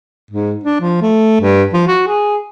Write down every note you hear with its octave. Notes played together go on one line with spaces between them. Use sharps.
G#2
D4
F3
A3
G2
F3
F#4
G#4